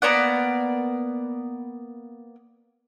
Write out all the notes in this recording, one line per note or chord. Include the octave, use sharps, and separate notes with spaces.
A#3 B3 D5 F#5